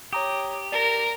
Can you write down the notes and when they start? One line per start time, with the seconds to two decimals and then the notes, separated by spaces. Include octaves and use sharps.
0.13 G4 C#5 A#5 D#6
0.72 A#4 D5 A#6